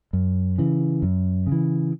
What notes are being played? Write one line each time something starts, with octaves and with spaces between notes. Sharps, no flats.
F#2
C#3 E3
F#2
C#3
E3